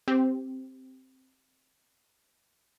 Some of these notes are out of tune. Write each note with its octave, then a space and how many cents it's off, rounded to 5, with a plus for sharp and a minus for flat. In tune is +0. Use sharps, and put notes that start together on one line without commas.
C4 +0 G4 +0